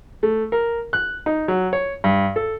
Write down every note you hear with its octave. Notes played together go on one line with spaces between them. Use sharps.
A3
A#4
F#6
D#4
F#3
C#5
G2
A4